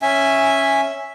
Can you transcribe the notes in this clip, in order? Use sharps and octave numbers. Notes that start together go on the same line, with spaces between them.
C#4 E5 G#5